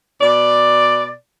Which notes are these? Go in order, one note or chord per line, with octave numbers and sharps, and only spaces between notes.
B2 D5